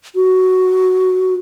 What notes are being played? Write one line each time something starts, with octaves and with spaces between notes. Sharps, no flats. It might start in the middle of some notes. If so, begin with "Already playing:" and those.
F#4